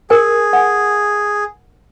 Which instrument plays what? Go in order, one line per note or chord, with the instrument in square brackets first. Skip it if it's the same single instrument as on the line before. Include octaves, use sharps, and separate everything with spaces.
[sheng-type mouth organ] G#4 [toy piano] A#4 G#5
[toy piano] F#5 G#5